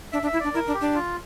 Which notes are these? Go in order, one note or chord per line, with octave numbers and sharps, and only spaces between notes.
D4 E5
D4
E5
E4
D4 D5
E4 A#4
D4
G4
D4
F4